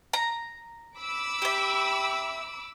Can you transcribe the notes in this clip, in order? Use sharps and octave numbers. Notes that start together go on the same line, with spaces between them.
A#5
B5 D6 E6
G4 E5